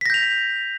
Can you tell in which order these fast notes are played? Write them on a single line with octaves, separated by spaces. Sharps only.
B6 A#6 G6 F7